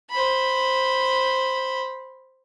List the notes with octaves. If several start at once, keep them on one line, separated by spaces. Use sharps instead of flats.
C5 B5